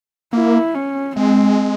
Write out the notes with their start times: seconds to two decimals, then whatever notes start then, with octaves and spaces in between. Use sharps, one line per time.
0.33 A#3 E4
0.75 C#4
1.16 G#3 C4